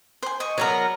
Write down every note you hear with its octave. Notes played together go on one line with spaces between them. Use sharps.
C5 G#5
D#5 C#6
F#3 B3 A#4 C#5 D5 A#5